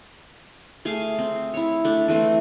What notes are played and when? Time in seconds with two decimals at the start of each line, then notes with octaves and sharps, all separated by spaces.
0.85 A3 G#4 F5
1.19 C4
1.54 E4 C#5
1.85 A3 D4
2.08 E3 A3 C4